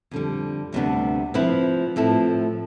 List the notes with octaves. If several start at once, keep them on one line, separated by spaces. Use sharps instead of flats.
F2 D3 G3
D2 C3 G3 B3 D4
F3 C4 E4 B4
A2 F3 C4 E4 A4